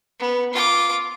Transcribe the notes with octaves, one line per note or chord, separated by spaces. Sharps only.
B3
F4 D6